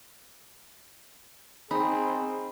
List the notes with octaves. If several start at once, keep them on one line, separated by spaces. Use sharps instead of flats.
C4 D#4 G#4 B5